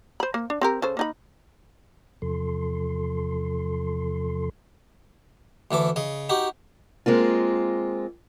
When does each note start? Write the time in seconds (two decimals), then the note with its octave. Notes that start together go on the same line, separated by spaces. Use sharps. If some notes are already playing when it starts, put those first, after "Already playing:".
0.20 C5 B5
0.34 A#3
0.50 D4
0.61 C4 G4 A#4
0.82 C#3 A4 C5
0.97 A#3 D#4 B5
2.22 E2 C3 F3 A4 C6
5.71 D2 E3 A4 D6
5.96 C#3 D#5
6.29 D#4 F#4 G4
7.06 G#3 A#3 C4 F4